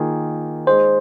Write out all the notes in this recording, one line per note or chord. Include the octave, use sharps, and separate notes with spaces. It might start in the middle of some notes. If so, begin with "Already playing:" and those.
Already playing: D#3 A#3 F4 G#4
G#3 D#4 G#4 C5